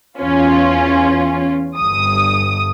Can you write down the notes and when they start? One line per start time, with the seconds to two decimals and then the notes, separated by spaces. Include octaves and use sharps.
0.19 E2 C#4 F4
1.78 G1 G2 D#6